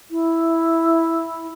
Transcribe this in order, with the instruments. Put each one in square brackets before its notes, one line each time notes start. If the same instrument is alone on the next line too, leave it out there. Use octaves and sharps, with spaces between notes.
[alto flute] E4